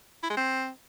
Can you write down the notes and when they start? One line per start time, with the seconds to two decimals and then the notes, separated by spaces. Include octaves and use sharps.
0.23 E4
0.30 G#3
0.37 C4